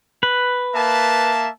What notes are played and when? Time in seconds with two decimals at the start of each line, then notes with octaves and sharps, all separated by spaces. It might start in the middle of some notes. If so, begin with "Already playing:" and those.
0.23 B4
0.75 A#3 E5 A5